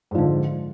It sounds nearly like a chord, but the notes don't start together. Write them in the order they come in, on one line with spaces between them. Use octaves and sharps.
G#2 F3 D3